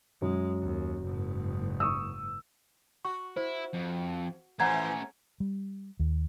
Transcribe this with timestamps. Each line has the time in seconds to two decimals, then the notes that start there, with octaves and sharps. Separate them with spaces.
0.22 F#2 G#3
0.62 D#2
1.03 F#1 G#2
1.80 C#6 D#6 E6
3.05 F#4 C#6
3.37 E4 C5
3.74 F2
4.60 E3 F3 A3 C#4 F#5 A#5 G#6
5.40 G3
5.99 D#2